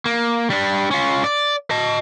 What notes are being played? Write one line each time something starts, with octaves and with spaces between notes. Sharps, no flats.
A#3
G3 D4
C#4 F4
D5
D#5 A5